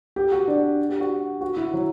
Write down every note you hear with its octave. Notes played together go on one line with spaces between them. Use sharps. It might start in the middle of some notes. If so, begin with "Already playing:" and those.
G4
F#4
D4
G4
F#4
F#4
E4
F#3